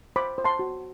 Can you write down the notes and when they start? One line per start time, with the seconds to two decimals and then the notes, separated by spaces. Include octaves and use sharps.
0.16 C5 B5 D6
0.38 C5
0.45 A5 C6
0.59 F#4